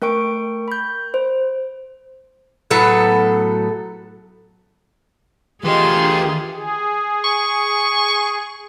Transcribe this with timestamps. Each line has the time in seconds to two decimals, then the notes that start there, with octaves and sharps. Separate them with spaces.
0.02 A3 A#4 G5 C#6 D7
0.68 B5 G6
1.14 C5
2.71 A2 F#3 B3 A4
5.64 D2 E3 A3 F4 G4 G#4 D#5 C6
6.55 G#4
7.24 C#6